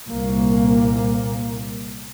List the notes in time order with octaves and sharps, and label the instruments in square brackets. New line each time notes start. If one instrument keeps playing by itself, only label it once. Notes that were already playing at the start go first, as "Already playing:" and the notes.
[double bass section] C2 A#2 A#3